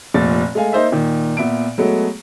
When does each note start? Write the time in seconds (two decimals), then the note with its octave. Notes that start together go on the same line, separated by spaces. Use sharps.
0.14 F1 A#2 A6
0.55 G#3 A3 F5 G#5
0.73 A#3 D#4 C5 E5
0.92 A#2 D#3
1.37 A#2 B3 E5 D7
1.78 F#3 G#3 A3 B3